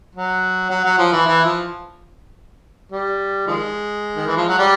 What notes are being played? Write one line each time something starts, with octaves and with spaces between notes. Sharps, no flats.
F#3
F#3
F#3
F3
E3
E3
F3
G3
D#3 F3 G#3
D#3
E3
F3
F#3
G3